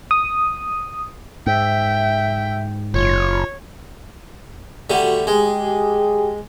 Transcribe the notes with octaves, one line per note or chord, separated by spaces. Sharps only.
D#6
G#2 E5 G5
F#1 F4 C#5
D3 G3 A3 F#4
G#3 G4 G#4